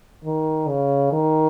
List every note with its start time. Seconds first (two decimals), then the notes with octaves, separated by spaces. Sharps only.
0.25 D#3
0.68 C#3
1.13 D#3